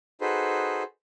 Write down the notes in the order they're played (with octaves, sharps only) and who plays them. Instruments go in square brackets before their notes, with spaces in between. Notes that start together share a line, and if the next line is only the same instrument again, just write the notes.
[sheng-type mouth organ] D#4 F#4 G#4 A4 B4 C5